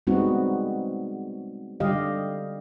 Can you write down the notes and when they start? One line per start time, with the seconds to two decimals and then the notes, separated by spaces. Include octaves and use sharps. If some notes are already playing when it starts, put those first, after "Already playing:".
0.07 G3 G#3 B3 C4 D#4 F#4
1.80 D3 G3 G4 D#5 F5